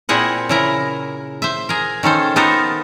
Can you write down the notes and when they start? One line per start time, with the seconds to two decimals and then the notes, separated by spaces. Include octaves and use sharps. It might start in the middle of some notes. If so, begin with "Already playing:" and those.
0.09 A#2 C4 E4 G#4 A#4 F#5
0.49 C#3 E4 A#4
1.42 C5 E5
1.69 G#4 A#4
2.03 D#3 C#4 A4 C5
2.36 B3 D#4 F4 A4 A#4 C5